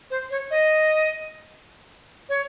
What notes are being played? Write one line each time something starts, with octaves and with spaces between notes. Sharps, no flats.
C5
C#5
D#5
C#5